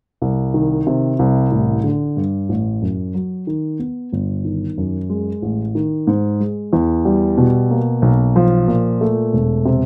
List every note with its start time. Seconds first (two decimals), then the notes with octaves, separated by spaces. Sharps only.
0.22 C2
0.54 D#3
0.87 C3
1.19 C2
1.52 A1
1.84 D3
2.17 G2
2.49 A1
2.82 F#2
3.14 F#3
3.47 D#3
3.79 B3
4.13 G1
4.45 D#3
4.78 F#2
5.10 G#3
5.42 A1
5.75 D#3
6.07 G#2
6.40 G#3
6.73 E2
7.05 G3
7.38 B2
7.71 A#3
8.02 B1
8.36 F3
8.68 A#2
9.01 A3
9.33 E1
9.65 C3